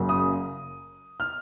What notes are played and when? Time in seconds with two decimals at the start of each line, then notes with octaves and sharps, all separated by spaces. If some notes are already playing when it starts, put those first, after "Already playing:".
Already playing: F#1 F#2 C#3 F#3 A#3
0.09 D#6
1.20 F6